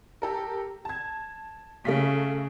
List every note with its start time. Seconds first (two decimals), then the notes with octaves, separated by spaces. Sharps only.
0.22 G4 A4 A#4
0.85 A5 G#6
1.85 C#3 A3 F5 B6